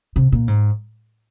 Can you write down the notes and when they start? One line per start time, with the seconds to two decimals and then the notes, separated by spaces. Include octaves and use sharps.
0.16 C3
0.32 A#2
0.48 G#2